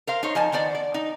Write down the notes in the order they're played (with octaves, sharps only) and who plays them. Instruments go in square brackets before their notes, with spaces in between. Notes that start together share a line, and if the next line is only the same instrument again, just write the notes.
[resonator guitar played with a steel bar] A#4 C5 F5
D#4 C5 C#5
F3 D#4 D#5 G#5 A5
D#3 B3 C5 D5
D5
D#4